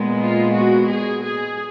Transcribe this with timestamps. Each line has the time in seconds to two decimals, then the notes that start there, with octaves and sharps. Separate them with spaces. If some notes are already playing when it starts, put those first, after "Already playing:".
Already playing: A#2 G#3 B3
0.18 F4
0.53 F#4
0.88 G#4
1.23 G#4